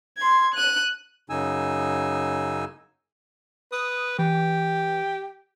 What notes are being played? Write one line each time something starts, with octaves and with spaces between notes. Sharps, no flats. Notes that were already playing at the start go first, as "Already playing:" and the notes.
C6 G#6
F#6 D#7
F#2 C#3 D#4 G#5 E6
B4 D#6
E3 G4